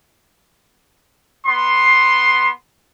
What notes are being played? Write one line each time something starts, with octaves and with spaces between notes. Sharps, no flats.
B3 C6